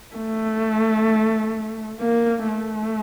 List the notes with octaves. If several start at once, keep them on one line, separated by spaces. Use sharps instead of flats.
A3
A#3
A3